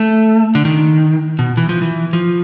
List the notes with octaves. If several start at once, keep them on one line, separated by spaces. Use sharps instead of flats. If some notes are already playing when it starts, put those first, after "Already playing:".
Already playing: A3
D3
D#3
B2
E3
F3
E3
F3